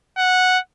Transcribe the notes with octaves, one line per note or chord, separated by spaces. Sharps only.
F#5